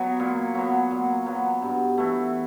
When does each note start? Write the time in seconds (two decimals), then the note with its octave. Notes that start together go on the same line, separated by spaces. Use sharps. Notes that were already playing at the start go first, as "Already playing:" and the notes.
Already playing: F#3 B3
0.20 A#2
0.55 F#3 B3
0.91 A#2
1.26 F#3 B3
1.62 G2
1.98 E3 A3